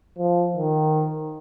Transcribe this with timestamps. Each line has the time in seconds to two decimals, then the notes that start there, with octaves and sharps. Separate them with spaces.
0.18 F3
0.56 D#3